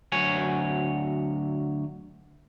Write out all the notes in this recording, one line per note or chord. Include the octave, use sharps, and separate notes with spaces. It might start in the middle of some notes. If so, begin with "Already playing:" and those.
D2 F#3 C#5 G#5